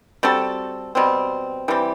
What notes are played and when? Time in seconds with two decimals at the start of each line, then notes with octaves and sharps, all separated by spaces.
0.23 G3 C4 F#4 A4
0.95 B2 G3 C4
1.68 E3 G3 C4 G4